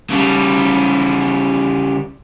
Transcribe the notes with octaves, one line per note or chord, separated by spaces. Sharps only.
C#3 G3